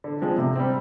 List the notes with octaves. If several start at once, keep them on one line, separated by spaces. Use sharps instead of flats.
D3
F3 G#3 C4
C3
G3 C4